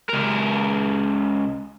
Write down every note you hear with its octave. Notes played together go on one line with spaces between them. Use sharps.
C#2 A#4